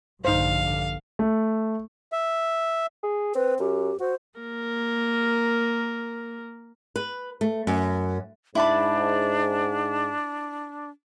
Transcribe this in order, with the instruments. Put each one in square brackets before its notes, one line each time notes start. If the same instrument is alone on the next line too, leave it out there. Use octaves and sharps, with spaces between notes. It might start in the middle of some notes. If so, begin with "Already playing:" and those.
[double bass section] A#1 G2 D3 [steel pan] D#4 C5 [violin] F5
[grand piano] A3
[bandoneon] E5
[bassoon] G#4
[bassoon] C4 [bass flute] B4
[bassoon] F#2 [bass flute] G4
[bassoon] F#4 [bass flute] C5
[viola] A#3 A#4
[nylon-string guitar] B4
A3
F#2
[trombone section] G#2 [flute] D4 [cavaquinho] E4 A5 B5